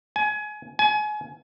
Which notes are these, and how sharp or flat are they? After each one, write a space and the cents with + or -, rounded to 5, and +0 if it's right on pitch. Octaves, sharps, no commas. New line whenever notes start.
G#5 +25
G#5 +30